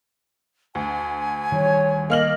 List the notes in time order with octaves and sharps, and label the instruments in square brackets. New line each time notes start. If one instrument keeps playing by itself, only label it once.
[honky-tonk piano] D2 [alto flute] G#5
[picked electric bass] D#3 G3 [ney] C#5
[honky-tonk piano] A#3 F6 F#7 [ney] D#5